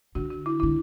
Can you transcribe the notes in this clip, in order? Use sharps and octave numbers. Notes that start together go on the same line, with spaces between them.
D3 F#4
F#4
E4
D3 E4